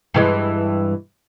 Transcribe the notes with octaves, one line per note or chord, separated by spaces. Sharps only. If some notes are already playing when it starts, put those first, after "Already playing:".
G2 E3 G#3